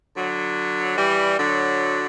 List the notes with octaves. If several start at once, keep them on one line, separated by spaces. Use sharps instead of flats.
D3 F#3
E3 G3
D3 F#3